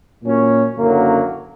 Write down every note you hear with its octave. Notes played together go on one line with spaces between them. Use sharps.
A#2 F#3 A#3 C#4
F#1 F#2 D3 F#3 A#3